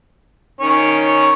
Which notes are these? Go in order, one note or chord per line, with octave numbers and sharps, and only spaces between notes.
D#3 C#4 C#5